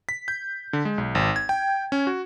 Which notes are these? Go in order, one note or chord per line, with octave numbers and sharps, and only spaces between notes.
B6
G6
D3
G#3
B1
G#1
G#6
G5
C#4
F#4